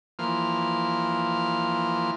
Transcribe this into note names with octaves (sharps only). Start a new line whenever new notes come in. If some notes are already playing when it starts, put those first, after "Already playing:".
E3 F3 A#3 F6